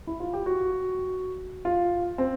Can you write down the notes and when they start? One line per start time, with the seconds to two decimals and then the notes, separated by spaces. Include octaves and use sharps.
0.07 E4
0.20 F4
0.33 G4
0.46 F#4
1.65 F4
2.18 C4